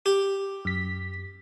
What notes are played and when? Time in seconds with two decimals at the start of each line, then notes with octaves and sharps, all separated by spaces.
0.06 G4
0.65 F#2 B6